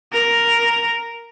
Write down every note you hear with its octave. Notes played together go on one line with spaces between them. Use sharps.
A#4